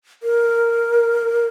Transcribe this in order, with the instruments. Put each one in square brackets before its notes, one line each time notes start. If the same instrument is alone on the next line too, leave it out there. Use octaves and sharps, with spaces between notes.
[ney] A#4